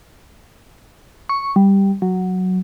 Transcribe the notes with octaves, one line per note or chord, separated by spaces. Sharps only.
C#6
G3
F#3